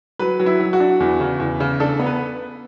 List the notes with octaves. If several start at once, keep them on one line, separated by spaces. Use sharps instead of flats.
F#3 B4
F#3
E4
F#3
F#4
D4
E2
C#3
E2
C#3
D4 A4
B3
B4